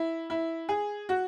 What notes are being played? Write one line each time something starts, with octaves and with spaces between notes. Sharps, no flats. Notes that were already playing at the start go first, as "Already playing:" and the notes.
Already playing: E4
E4
G#4
F#4